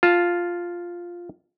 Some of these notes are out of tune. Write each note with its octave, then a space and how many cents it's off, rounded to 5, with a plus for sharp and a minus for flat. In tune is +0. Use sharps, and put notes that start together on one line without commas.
F4 +0 A5 +0